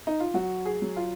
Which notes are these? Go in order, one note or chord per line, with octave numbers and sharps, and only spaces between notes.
D#4
F4
F#3 F#4
G#4
F#3
F4